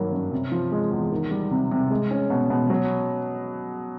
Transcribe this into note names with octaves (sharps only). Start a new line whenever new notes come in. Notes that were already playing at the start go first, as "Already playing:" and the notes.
Already playing: G2 D#3 F#3 A#3
F#2
C3
F3
G#3
E2
D#3
G3
C3
C3
G#3
C#4
B2
B2
F#3